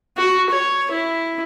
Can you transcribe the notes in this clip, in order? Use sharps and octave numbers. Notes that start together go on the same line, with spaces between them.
F#4
C#5
E4